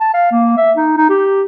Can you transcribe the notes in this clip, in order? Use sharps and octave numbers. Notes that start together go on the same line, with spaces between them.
A5
F5
A#3
E5
D#4
D#4
G4